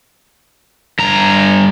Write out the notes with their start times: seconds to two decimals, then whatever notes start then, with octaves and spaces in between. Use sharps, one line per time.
0.99 G2 A#5